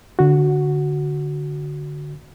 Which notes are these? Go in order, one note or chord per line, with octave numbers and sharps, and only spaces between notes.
D3 F#4